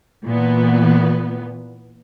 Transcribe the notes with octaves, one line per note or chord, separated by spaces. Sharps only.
A#2 E3 B3